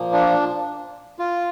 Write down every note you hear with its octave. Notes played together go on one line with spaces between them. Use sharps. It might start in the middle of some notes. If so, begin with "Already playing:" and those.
Already playing: A#2 F3 A#3
D4
F4